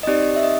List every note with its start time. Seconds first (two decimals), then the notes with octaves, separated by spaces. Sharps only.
0.03 D#5
0.07 C4 D#4 G4 D5
0.36 E5
0.43 D#5